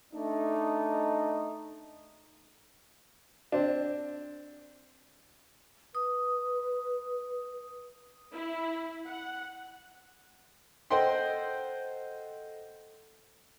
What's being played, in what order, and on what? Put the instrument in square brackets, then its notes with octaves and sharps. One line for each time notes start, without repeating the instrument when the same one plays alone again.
[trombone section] A3 D4 D#4
[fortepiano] C4 D4
[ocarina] B4 [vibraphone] D#6
[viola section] E4
F#5
[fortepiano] A4 C5 D#5 F#5 G5 C6